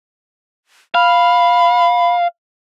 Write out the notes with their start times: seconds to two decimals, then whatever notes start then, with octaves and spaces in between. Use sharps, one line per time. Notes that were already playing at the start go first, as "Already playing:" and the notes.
0.95 F5 B5